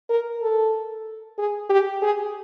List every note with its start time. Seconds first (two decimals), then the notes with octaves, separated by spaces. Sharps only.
0.10 A#4
0.42 A4
1.39 G#4
1.70 G4
2.03 G#4